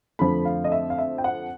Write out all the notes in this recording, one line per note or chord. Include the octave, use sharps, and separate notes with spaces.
F2 D3 F3 A3 B5
F5
D#5
E5
F5
E5
G5
F#5